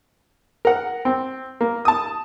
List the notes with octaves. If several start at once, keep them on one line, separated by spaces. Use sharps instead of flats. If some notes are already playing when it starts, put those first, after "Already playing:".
A#4 F#5
C4
A#3
A5 D#6